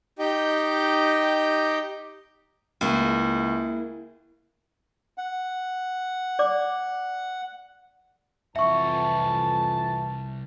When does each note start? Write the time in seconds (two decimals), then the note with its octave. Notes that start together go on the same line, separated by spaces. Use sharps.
0.19 D#4 G4 D#5 G5
2.81 C#2 A#3 E4 G#4
5.18 F#5
6.39 D5 D6
8.56 C2 F2 E3 E5 F#5 A5 C#6